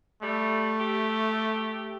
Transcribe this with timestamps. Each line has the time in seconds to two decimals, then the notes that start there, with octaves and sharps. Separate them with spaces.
0.23 G3 A3
0.80 G4